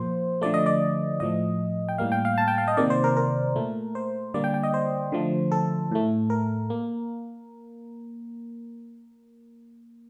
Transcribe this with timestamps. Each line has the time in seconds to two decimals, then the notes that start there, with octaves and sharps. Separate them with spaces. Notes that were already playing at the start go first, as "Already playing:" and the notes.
Already playing: A#2 F3 A#3 C5
0.42 D3 F3 A3 D5
0.54 D#5
0.66 D5
1.20 A2 F3 A3 D#5
1.89 G5
1.98 A2 G3 A#3 F5
2.12 G5
2.25 F5
2.38 A5
2.48 G5
2.58 F5
2.68 D#5
2.77 C3 D#3 A#3 D5
2.90 C5
3.04 A#4
3.17 A#4
3.56 A#2 A3
3.95 C5
4.34 D3 G3 A#3 D5
4.44 G5
4.54 G5
4.63 D#5
4.74 C5
5.12 D3 F3 A3
5.52 A4
5.92 A2 A3
6.30 A#4
6.70 A#3